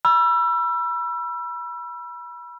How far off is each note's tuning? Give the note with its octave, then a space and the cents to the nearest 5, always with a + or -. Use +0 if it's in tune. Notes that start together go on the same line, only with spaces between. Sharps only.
B5 -30 E6 +30